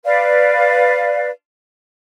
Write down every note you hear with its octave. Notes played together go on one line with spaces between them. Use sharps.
B4 D5 F5